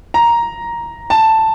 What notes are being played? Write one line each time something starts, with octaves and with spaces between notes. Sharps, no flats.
A#5
A5